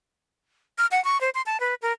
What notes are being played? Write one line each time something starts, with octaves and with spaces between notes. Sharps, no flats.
F6
F#5
C#6
C5
C6
A5
B4
A#4